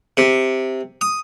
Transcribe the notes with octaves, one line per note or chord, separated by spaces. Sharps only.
C3
D#6